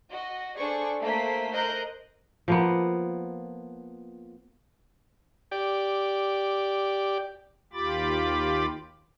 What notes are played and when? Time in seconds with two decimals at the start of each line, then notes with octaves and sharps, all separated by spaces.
0.11 F#4 D#5
0.57 D4 G#4 A4 C5 D5 C#6
1.02 A3 A#3 C5 B6
1.52 A#4 C5 D#5 F#6 G6
2.48 F3 A#3 B3
5.52 G4 D5
7.73 D#2 F4 G4 B5 D6 A6